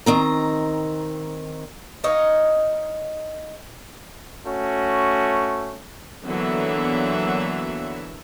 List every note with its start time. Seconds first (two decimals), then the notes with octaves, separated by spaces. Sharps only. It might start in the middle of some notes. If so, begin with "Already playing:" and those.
0.06 D#3 C4 A#5
2.04 D#4 C#5 D#5 F5
4.45 A3 C#4 F#4
6.26 D3 E3 F#3 A#3 B3 E5